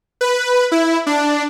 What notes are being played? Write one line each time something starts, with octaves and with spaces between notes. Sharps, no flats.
B4
E4
D4